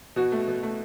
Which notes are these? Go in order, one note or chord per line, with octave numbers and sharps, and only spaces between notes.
B2 F#4
A3
B2
A3